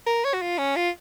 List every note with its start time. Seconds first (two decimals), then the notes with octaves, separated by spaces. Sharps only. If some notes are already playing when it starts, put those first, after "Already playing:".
0.06 A#4
0.25 C#5
0.33 F#4
0.42 F4
0.58 C#4
0.76 F4